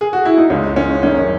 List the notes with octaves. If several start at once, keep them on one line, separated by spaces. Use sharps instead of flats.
G#4
F#4
E4
D#4
C#2 C#3 G#3 C#4
C#4
G#1 F#2 D#3 C#4